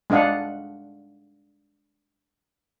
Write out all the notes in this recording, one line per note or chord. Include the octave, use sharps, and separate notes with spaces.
G#3 D4 D#5 F5 F#5